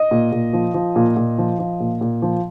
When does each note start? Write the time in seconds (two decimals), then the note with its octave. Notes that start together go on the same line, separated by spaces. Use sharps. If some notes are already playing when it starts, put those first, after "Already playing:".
Already playing: D#5
0.11 A#2
0.32 A#2
0.53 F3
0.74 F3
0.96 A#2
1.16 A#2
1.38 F3
1.59 F3
1.80 A#2
2.01 A#2
2.22 F3